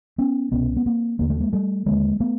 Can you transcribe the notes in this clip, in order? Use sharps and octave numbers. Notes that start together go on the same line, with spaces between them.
B3 C#4
C2 B2 B3 C#4
B3
A#3 C4
D#2 D3 A#3
A3
G#3 A#3
G3 A3
D#2 D3 G#3 A#3
A3 B3